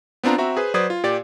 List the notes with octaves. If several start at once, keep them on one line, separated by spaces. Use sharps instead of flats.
B3 C4 D4 F4 A#5
C4 F#4 E5 A#5
G#4 B4 C5
F#3 B4 C5 D5 D#6 G#6
F4
A#2 G4 D5 A6